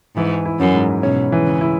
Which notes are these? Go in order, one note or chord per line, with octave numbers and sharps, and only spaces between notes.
G#2 E3
E4
F#2
G#2
B2 C#4
E3
C#3
E4